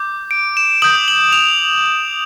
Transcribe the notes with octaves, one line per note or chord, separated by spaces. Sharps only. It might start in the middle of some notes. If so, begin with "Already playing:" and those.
Already playing: D6 G6
D7
E7
D#6 G6 F#7
F#7
F7